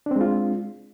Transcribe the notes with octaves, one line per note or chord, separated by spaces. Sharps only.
G#3 C4 D4 F4